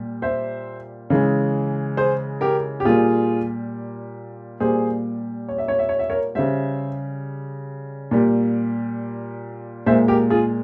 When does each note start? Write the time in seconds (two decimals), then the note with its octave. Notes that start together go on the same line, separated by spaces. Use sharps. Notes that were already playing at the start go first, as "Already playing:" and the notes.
Already playing: A#2 G3
0.22 C5 E5
1.10 C#3 E3 G#3
1.97 G#4 C5
2.41 G4 A#4
2.80 G4
2.85 A#2 G3 F4 G#4
4.60 A#2 G3 G#4 C5
5.48 C#5
5.58 E5
5.68 C#5
5.79 E5
5.89 C#5
5.99 E5
6.10 A#4 C#5
6.35 C#3 G3 C5 E5
8.11 A#2 G3
9.86 A#2 G#3 C5 E5
10.08 G4 A#4
10.30 F4 G#4